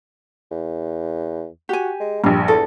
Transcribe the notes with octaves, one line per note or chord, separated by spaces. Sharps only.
E2
F#4 G4 G#5
G#3
A#1 G2 D4 G4
E2 A4